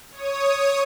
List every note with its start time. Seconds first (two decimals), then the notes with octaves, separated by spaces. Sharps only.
0.11 C#5 D#6